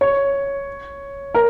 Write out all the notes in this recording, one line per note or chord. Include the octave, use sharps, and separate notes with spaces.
C#5
A#4